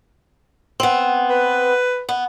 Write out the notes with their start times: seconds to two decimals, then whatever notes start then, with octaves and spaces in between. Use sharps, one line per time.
0.80 B3 C4
1.30 B4
2.09 B3